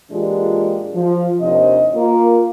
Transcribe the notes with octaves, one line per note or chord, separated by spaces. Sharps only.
A#2 E3 G#3 D4 F4 G4
F3
D#2 C3 D4 C5 D#5
A#3 F4